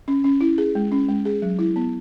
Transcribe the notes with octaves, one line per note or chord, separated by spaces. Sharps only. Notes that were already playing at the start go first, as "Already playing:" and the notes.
C#4
C#4
E4
G#4
G#3
C#4
G#3
G#4
F#3
E4
B3